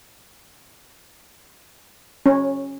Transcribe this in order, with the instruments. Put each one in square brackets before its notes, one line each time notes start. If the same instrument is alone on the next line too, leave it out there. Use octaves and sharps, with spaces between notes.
[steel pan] C#4